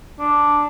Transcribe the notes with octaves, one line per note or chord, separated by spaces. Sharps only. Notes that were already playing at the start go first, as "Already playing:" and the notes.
D4